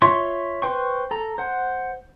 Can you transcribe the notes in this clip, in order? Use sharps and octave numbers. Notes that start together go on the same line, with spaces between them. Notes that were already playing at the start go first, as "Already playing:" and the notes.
F4 C#5 E5 C6 C#6
B4 C5 G5 C#6
A4 A#5
C5 F#5